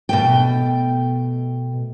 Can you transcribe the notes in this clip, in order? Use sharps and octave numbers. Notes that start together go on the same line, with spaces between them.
B2 A3 G5